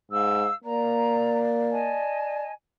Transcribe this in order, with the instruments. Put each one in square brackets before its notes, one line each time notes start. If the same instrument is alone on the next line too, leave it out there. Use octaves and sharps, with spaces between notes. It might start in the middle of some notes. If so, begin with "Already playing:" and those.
[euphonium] G#2 [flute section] F5 E6
[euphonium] A#3 [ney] D5 [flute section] A#5
[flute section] D#5 G#5 A5